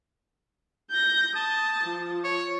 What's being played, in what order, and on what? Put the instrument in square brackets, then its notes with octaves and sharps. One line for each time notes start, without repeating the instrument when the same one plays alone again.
[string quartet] G6 A#6
[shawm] A5 [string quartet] D#6
[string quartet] F3
[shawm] C#5